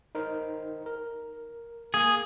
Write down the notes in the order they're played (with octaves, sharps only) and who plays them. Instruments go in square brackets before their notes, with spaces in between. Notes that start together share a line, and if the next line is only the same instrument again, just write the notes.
[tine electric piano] D#4 A#4 C5
A#4
[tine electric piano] A#3 [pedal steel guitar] G#4